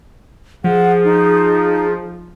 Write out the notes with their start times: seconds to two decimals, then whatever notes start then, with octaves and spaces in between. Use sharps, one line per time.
0.64 F3 G#4 F#5
1.04 D#4